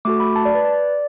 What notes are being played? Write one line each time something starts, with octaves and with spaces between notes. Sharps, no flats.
A3 F#4 A4 D6
B5
A5
D5
B4
D5